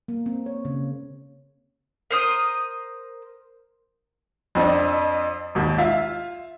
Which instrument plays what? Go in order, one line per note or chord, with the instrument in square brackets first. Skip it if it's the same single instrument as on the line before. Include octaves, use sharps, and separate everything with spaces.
[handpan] A#3
C4
C#5
C#3
[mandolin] A#4 C5 D#6
[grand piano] F2 C4 D4 D#5
G#1 D#2
F4 E5 F5